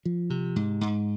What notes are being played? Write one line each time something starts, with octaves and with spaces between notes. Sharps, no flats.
F3
C3
G#2
G#2